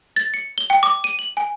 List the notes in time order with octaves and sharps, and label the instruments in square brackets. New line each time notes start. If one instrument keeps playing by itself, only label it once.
[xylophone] A6
C#7
G7
G5
D6
D#7
F#7
G#5